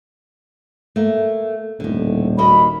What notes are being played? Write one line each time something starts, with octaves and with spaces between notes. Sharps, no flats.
A3 A#3
D#1 A2 D3
A#3 F#4 D#5 B5